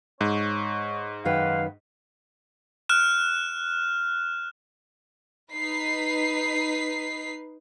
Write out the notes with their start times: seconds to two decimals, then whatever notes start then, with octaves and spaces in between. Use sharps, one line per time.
0.21 G#2 C#5
1.25 F#2 D#3 B4 F5 F#5
2.89 F6 F#6 E7
5.54 D#4 B4 B6 C7